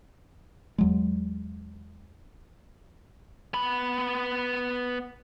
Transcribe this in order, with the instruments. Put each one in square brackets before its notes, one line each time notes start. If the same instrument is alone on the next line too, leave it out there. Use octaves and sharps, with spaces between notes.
[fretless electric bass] E2 F#3 G#3
[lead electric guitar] B3 B5